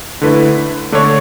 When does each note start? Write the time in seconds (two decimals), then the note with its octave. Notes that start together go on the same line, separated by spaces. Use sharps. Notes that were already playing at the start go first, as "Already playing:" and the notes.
0.21 D3 A3 E4 B4
0.92 D3 A3 D4 A4 C#5